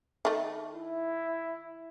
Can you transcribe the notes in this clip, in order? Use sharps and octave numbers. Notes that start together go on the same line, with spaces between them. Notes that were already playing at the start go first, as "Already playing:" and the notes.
D#3 A3
E4